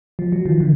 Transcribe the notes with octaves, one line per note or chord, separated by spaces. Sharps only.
F3
F#3
D#3 F3
D3 E3